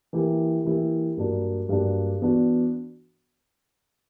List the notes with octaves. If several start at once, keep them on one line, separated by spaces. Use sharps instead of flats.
E3 A#3 E4 G4
E3 A#3 E4 G4
G2 F#3 A#3 D4
G2 F#3 A#3 D4
E3 B3 D4 F#4